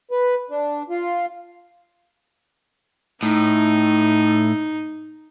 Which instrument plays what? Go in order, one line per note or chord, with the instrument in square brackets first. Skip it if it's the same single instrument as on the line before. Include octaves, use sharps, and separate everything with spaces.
[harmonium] B4
D4
F4
[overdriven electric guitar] A2 [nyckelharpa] D#4